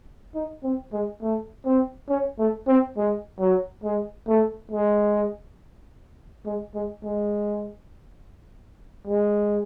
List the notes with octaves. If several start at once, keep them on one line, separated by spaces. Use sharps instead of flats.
D#4
C4
G#3
A3
C4
C#4
A3
C4
G#3
F#3
G#3
A3
G#3
G#3
G#3
G#3
G#3